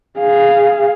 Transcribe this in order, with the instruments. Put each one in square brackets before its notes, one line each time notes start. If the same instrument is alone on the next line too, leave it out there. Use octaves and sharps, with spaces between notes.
[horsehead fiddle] G#4 F5